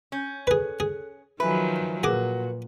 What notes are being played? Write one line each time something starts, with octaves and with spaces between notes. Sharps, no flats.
C#4 C#5 G6
G#4 A4 B4 F#6
G#4
D#3 F3 F#3 B4 E5 G#5
A#2 F#4 G#4 A#4 B4 D6